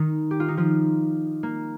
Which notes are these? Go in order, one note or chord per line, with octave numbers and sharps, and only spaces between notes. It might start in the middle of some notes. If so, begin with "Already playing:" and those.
Already playing: D#3 D#4
G4
F4
D#4
F3 F4
A#3